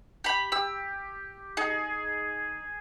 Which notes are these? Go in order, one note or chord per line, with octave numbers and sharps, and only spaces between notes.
G4 B5
G4 E6
D#4 G#4